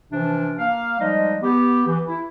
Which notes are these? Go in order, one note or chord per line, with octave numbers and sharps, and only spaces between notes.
C3 E3 F3 C#4 D4
A#3 F5
F3 G3 G#3 D#4 D#5
B3 G4
E3
E4